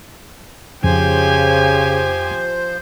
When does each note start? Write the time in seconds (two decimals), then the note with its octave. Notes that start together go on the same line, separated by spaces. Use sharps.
0.84 F2 C#3 F3 G4 C5 G#5